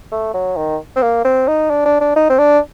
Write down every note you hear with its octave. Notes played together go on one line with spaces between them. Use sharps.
A3
F#3
D#3
C4
A#3
C4
D#4
D4
D4
D4
D#4
C4
D4